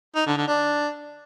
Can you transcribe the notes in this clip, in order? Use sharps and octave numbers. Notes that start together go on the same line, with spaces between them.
D#4
D3
D3
D4